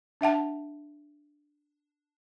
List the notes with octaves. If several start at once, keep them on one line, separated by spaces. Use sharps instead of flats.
D4 E5 F#5 A5